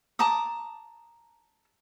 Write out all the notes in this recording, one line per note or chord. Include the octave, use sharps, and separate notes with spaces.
A5 A#5 D6 D#6